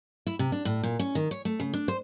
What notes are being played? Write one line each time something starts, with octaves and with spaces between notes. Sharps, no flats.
E4
C3
D4
A2
A#2
C#4
D#3
C#5
A3
C#3
D4
C5